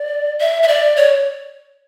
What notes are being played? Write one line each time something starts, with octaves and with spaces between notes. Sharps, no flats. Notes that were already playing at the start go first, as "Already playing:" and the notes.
Already playing: D5
E5
E5
D5
C#5